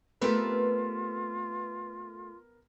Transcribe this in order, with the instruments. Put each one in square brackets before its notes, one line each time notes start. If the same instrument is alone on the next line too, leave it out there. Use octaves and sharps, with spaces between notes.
[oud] A3 C4 G4 [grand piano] B3 A#4 [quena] F4 [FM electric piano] B4